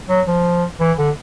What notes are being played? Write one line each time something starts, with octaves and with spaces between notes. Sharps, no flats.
F#3
F3
E3
D3